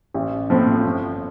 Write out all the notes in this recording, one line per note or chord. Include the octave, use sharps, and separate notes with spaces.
A1
A2 F3 C4
G1